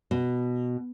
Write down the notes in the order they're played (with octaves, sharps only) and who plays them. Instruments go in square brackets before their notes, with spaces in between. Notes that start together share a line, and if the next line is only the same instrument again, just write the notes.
[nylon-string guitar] B2